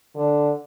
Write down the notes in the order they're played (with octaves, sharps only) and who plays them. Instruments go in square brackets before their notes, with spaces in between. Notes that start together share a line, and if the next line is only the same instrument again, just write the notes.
[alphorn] D3